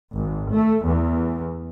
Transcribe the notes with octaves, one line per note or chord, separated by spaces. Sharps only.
G#1
A3
E2